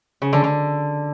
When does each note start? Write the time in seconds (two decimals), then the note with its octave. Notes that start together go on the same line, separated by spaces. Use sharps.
0.22 C#3
0.33 D3
0.44 D3